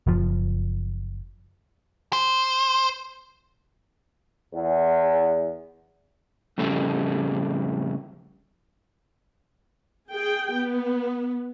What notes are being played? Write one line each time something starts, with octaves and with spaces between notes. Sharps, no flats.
F#1 F3
C5
E2
F2 A2 C#3 G3 A3
G#4 G5
B3